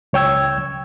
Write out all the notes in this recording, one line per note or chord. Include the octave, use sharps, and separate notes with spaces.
C#2 C#5 G5 E6 G#6